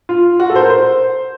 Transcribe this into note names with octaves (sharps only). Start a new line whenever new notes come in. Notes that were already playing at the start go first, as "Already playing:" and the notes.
F4
F#4
A4
C5
A#4
C5